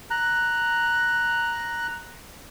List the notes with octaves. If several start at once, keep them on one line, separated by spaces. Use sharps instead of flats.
A#5 F#6